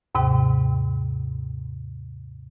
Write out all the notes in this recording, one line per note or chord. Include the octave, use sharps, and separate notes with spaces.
D#2 G#2 C3 G5